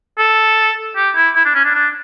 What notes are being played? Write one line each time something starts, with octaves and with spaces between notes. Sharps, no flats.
A4
G4
E4
E4
D4
C#4
D4
D4